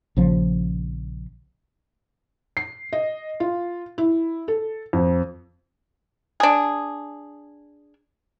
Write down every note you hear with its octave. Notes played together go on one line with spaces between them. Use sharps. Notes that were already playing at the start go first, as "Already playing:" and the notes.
A#1 C#3 F3
C7
D#5
F4
E4
A4
F2
D4 G#4